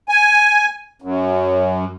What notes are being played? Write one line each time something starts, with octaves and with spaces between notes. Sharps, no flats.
G#5
F#2